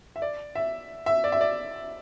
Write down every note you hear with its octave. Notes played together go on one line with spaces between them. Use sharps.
E5
D5
E5
E5
D5
E5
D5